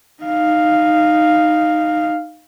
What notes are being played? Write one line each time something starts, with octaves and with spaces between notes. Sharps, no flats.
D#4 F5